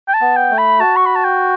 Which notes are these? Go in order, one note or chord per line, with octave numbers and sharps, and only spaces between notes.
G5
A5
B3
G5
A3
B5
F#4 A5
C#6
B5
A5
G5